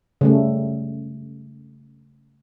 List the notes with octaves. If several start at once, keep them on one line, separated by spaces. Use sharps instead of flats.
C#3 G3 A3